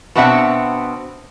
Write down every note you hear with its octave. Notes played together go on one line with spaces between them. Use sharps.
B2 B3 C4 D4 E5 F#5